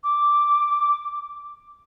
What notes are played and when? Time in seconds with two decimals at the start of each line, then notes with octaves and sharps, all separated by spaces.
0.04 D6